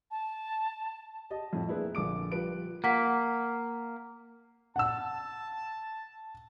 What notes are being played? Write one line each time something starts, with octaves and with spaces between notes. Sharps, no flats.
A5
G4 D#5 A5
F2 A2 F3
A3 A#3 D4 E4 G#4 B4
A#1 D3 D6 D7
F3 G3 F4 B4 D7
A#3 F#5 B6
F#5 A5 E6